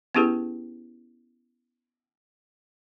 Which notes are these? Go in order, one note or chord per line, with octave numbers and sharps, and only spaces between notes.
B3 C#4 E4 G4 G#4 B4